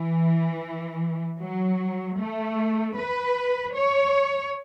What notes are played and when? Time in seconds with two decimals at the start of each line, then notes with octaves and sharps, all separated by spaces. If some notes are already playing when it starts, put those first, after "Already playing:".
Already playing: E3
1.40 F#3
2.19 A3
2.97 B4
3.75 C#5